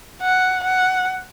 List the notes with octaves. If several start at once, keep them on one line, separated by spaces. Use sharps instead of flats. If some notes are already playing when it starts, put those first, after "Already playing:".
F#5
F#5